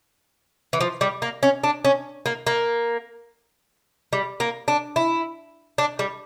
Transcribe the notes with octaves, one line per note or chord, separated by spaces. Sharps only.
E3
F3
G3
A#3
C#4
D4
C#4
A#3
A#3
G3
A#3
D4
E4
D4
G3